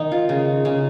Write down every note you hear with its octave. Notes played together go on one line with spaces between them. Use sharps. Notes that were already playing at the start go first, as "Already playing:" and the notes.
Already playing: D#3 D#4
F4
C#3
C#3